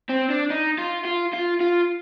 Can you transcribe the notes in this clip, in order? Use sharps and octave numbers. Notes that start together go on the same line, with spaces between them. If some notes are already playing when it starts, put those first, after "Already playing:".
C4
D4
D#4
F4
F4
F4
F4